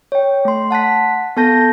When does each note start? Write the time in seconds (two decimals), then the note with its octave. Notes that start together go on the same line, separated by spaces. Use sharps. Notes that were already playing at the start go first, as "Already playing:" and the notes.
0.12 C#5 G5
0.45 A3 C6
0.71 F#5 A5 F#6 B6
1.37 B3 A4 A5 G6 A#6